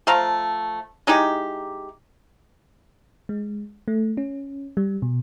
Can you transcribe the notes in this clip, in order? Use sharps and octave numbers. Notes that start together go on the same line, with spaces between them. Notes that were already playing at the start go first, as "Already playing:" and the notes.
F3 A3 F5 A#5
G#3 D#4 E4 G4
G#3
A3
C#4
G3
B2